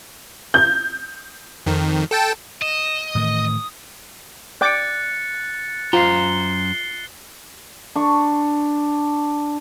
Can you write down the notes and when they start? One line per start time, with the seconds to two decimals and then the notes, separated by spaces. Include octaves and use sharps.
0.54 G6
1.66 F2 D#3
2.11 A4 G5 A5
2.62 D#5 E7
3.15 A2 D#3 E3 D#6
4.61 D5 G5 D6 F#6 A6 C#7
5.93 F#2 F4 C5 A#5 C7 G7
7.95 D4 C#6